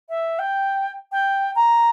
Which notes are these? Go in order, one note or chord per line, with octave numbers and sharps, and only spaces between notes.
E5
G5
G5
A#5